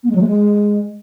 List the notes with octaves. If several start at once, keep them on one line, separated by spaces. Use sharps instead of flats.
B3
G#3
F#3
A3
G#3